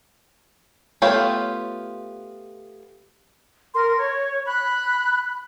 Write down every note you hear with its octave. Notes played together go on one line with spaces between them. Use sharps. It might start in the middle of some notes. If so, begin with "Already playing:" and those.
A3 B3 F4 G4 C#5
A#4 C6
C#5
B5 F#6